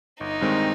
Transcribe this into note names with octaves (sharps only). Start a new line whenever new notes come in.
G1 D#4
G2 D#3 G#3 C4